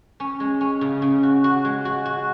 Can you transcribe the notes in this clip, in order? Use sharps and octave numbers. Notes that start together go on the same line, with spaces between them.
C#4
G#3
C#4
C#3
C#3
F#4
F#4
G#3
F#4
F#4